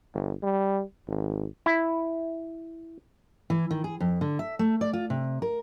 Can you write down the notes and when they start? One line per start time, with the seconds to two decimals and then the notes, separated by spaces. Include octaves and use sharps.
0.14 G1
0.43 G3
1.07 G#1
1.66 E4
3.50 E3
3.71 D#3
3.84 G#4
4.00 F2
4.21 D3
4.39 E5
4.59 A3
4.81 D5
4.93 F4
5.10 C3
5.42 A#4